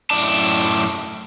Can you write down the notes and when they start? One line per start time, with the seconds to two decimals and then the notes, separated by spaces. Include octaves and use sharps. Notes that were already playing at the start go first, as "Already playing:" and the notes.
0.10 F#2 A2 D5 A5